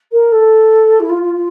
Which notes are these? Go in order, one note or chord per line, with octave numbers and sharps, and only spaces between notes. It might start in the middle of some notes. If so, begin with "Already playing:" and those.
A#4
A4
E4
F4
F4
F4